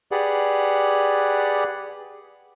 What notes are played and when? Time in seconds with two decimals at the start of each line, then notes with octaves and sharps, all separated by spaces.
0.12 G4 G#4 B4 D5 F#5